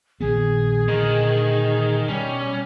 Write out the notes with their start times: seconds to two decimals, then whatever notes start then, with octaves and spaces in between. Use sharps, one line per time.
0.21 A#1 D#3 B3 G#4
0.88 A#2 D3 D#3
2.08 B2 G3 C#4